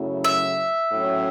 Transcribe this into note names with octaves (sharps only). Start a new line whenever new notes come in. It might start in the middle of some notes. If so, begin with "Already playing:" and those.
Already playing: F#2 C#3 F#3 A3 E4
E5
A2 F#3 C#4